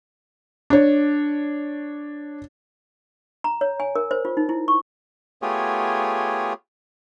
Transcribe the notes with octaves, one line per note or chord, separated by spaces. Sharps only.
D4 C#5
A#5
C#5
G#5
A#4
C5
F4
D#4
E4
C#6
A3 B3 F4 G4 G#4 C#5